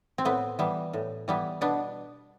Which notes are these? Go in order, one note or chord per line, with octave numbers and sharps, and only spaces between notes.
C4
A2 B3
E3 G3 B3
A2
E3 G3 B3
B2 B3 D4